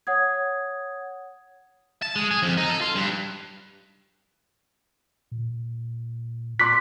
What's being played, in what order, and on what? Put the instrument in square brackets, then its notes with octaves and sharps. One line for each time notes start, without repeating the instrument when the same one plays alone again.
[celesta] C#5 F#5 D#6 G#6
[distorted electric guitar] A5
G#3
G#4
F2
D#4
A4
F4
G2
[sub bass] A#2
[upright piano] C6 D6 F#6 [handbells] B6